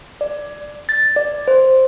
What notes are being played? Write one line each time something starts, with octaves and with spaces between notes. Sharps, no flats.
D5
A6
D5
C5